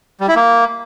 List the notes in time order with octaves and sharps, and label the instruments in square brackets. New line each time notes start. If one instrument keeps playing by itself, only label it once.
[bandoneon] G3
E4
A#3